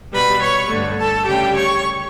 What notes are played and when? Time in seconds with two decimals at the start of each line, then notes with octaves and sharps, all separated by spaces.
0.12 B2 G3 B4 B5
0.41 C#5 C#6
0.70 G2 D3 A3
0.98 A4 A5
1.27 D2 C#3 G3 G4 G5
1.55 C#5 C#6